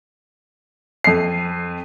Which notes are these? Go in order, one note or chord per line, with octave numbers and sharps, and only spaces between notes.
F2 C7